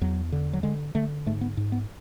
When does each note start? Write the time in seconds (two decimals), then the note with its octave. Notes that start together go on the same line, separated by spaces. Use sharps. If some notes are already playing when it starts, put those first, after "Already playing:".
0.01 E2 F#3
0.32 D3
0.53 F#3
0.63 D3 G#3
0.95 D3 A3
1.26 G#2 A3
1.41 B3
1.57 G#2
1.72 B3